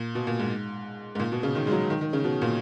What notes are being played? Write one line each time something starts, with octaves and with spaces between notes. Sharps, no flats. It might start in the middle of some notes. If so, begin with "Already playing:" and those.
Already playing: A#2
B2
A#2
G#2
G#2
A#2
B2
C#3
D#3
G#3
F#3
D#3
D#3
C#3
B2
A#2